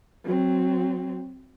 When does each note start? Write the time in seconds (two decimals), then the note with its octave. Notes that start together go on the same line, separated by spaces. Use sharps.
0.24 F#3 C4